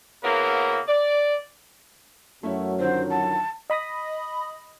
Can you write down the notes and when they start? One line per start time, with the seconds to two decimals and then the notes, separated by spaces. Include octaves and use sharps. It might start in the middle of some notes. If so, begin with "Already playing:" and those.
0.24 C#3 A#3 B3 E4 F#4 A#4
0.88 D5
2.43 F#2 F#3 A3 C#4 E4
2.79 D3 D#3 F3 C5
3.10 A5
3.70 D#5 B5 D#6 A#6